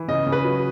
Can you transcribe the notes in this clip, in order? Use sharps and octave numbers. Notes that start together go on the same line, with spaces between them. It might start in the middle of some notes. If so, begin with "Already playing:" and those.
Already playing: E3
C#3 D#5
C#3
B4
F#3